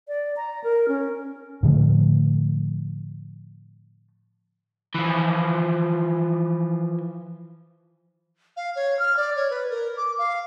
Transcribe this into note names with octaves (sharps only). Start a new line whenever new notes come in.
D5
A#5
A#4
C#4
A2 D3 F3 A3
E3 F3
F5
C#5
F6
D5
C#5
B4
A#4
D6
F5